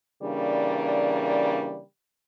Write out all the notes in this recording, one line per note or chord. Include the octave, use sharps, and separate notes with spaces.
C#3 E3 G3 A#3 D4